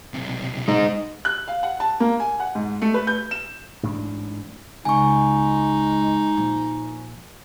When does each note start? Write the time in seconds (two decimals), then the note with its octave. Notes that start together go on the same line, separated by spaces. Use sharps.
0.14 B1 C3
0.68 G#3 D#4
1.25 F#6
1.48 F5
1.63 F#5
1.80 A5
2.00 A#3
2.20 G#5
2.40 F#5
2.55 G#2
2.82 A3
2.94 B4
3.07 G6
3.31 E7
3.83 A1 G#2 D4
4.85 C#2 G#3 D#4 G#5 C#6
6.37 A#2 F3